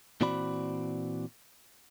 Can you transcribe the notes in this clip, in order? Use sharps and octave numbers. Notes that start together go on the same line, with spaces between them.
A#2 E3 C4 F#4 D5 B5